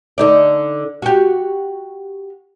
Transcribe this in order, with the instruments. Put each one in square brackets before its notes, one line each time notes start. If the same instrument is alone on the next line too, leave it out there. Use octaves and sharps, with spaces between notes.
[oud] D3 D#4 D5
F#4 G4